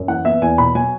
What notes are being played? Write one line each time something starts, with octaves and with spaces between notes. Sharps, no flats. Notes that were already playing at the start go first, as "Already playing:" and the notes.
Already playing: F#2
E3 F#5
B3 E5
E2 G#5
B2 B5
F#3 G#5